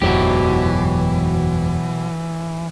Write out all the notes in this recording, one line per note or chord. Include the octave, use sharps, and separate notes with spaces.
F#1 E2 G#2 B2 E3 F#3 G4